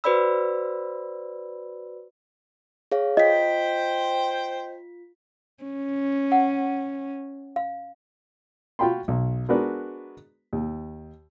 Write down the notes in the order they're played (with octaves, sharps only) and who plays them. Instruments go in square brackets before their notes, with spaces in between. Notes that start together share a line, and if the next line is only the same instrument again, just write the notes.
[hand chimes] F#4 B4 C5 D5 B5 E6
G#4 C#5 F5
[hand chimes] F4 B6 [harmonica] C5 G5 [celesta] D#5
[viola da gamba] C#4
[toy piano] F#5
F5
[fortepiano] F4 F#4 G5 B5 C6
B1
G#3 B3 D4 F#4 A#4 B4
D#2